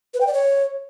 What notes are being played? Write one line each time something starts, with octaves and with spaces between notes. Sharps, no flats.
B4
G5
D5
C#5